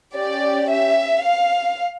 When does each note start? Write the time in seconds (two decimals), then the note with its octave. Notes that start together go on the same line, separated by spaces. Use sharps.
0.16 C#4 G4 D5
0.71 E5
1.25 F5